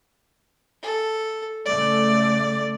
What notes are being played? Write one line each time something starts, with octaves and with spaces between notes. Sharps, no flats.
A4
C#3 A3 D5